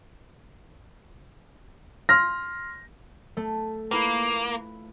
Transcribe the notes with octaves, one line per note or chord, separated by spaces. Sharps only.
C6 F6 A#6
A3
A#3 E4 F4 B4